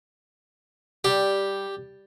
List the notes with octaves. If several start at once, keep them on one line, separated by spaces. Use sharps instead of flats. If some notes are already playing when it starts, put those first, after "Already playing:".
G3 G4